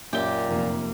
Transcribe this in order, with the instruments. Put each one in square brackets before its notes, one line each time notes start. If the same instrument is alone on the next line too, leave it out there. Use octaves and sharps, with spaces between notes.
[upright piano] F#2 G7 [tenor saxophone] A#2 [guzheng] G4
[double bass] F1 A#3